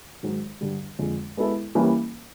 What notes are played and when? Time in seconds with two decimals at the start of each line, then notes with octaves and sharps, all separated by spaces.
0.23 G#2 D#3 F#3
0.61 G2 D3 G3
0.99 F2 D3 F3 G#3
1.37 G#3 B3 E4 A4
1.75 E3 G3 A#3 C#4